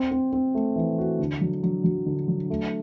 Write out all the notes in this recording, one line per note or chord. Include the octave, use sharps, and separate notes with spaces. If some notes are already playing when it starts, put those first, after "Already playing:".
Already playing: C4
C4
C4
A3
E3
F#4
D3
F#3
F#3
F#3
D3
F#3
A3